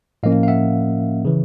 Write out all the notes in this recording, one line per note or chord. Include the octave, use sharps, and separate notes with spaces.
A2 F3 A#3 C#4 D#5 F5
F5
E5 F#5
C#3 E3